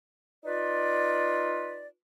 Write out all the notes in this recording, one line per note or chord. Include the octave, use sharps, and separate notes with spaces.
D#4 F4 B4 D5